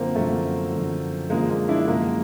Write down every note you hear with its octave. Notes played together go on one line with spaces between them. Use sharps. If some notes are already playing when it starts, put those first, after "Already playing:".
Already playing: F#2 D3 F3 A#3 C4
F#2 D3 F3 A3
F#2 D3 F3
F#2 D3 F3 G#3 A#3
G#3 A#3
D4 E4
F#2 D3 F3 G#3 A#3